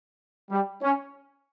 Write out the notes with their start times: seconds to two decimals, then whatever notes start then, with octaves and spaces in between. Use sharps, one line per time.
0.50 G3
0.82 C#4